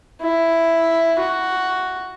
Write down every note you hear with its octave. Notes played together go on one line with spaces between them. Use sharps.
E4
F#4